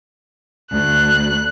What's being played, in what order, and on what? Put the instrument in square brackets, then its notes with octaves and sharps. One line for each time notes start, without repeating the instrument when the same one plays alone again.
[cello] D2 [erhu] F#6